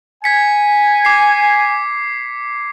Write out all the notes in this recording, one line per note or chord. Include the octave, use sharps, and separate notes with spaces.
G#5 G#6 B6 C#7
D6 C7